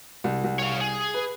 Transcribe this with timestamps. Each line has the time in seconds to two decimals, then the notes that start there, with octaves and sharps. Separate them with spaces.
0.24 C2
0.44 C2
0.59 C#5 F5
0.81 G#4
1.14 B4